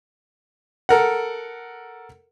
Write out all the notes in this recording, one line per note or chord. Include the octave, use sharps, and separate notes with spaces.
A4 A#4 F#5